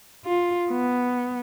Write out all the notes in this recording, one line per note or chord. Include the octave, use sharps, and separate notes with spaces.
F4
B3